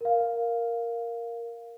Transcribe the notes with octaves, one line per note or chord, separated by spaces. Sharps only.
A#4 F5